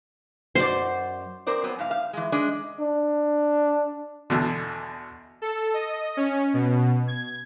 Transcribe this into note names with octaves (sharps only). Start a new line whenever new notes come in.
F#2 F#4 C5 D5
C4 A#4 C5 D5
F#3 B3 C4
G#2 F5
F5
E3 G#3
G#3 D4 D#5
D4
E2 B2 D3
A4
D#5
C#4
B2
G#6